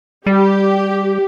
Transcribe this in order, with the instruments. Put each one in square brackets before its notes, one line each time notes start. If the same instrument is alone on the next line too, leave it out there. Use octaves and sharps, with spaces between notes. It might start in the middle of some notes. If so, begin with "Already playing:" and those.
[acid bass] G3 [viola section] G4